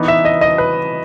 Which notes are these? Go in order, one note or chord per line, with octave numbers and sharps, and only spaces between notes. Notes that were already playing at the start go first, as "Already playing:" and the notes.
Already playing: E3 B3 D#4
E5
D#5
D#5
B4